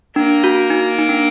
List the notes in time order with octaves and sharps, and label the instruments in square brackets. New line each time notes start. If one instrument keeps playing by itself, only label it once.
[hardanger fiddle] A#3 [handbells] D4
[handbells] F#4
D#4
D#4
D4